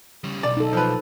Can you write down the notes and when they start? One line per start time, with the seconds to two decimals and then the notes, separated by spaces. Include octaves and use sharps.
0.24 C#3 G3
0.43 B1 D5
0.57 D#4 A4
0.73 F3 B4